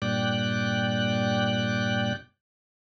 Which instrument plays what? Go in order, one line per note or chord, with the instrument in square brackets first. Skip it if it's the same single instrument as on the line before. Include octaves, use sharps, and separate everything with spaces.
[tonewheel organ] G2 A#2 D5 G5 F#6